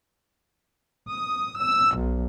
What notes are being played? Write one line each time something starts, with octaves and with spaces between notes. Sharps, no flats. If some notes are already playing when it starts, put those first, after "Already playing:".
D#6
E6
B1